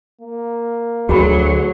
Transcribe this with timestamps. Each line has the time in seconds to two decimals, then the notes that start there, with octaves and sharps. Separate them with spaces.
0.21 A#3
1.09 D2 F#3 F#4 G#4 B5